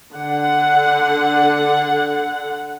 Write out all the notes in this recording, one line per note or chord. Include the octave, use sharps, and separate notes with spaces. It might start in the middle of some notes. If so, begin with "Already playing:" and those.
D3 F#5